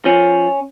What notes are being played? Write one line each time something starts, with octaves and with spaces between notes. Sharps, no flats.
F3 C#4